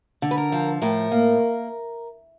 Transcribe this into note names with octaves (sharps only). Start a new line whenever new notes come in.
D3
B4
A#4
F3
A2 A#4
A#3